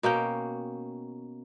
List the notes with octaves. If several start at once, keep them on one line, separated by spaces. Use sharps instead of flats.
B2 A#3 C#4 G5